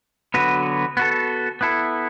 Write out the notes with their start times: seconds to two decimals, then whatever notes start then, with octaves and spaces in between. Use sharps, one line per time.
0.34 D3 F#3 B3 F#4 B4
0.97 B3 F#4 A4
1.61 B3 E4 A4